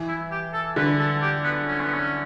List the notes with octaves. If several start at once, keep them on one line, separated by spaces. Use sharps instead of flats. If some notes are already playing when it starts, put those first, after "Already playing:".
Already playing: E3
E4
G4
A4
D3 B4
A4
G4
B3
C#4
B3
C#4